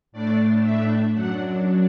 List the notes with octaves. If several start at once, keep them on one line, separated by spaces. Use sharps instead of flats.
A2 A3 D4 D5
E5
F#2 F#3 D4 F#5